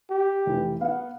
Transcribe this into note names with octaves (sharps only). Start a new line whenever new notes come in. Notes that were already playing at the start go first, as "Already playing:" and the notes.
G4
F1 E3
B3 F5 F#5